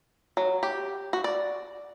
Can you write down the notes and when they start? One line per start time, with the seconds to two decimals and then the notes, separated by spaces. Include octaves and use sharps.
0.37 F#3
0.63 G4
1.13 F#4
1.24 D5